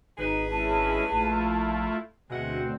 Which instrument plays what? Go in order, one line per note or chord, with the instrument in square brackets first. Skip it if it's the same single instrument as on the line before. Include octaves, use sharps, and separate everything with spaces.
[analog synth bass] G#1 [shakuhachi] D#4 [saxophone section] G#4 B4
[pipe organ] G#3 C#4 E4 [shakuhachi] A5
[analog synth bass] A#1 [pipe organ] A3 E4 F4
[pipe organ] D2 C4 [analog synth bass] B2 [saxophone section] G#3 E5 F#5